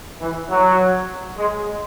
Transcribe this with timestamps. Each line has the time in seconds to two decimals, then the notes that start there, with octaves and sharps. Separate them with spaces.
0.20 E3
0.49 F#3
1.37 G#3